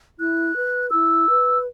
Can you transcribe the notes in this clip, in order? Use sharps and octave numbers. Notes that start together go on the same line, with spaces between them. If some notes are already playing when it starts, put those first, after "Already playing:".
E4 F#6
B4
E4 E6
B4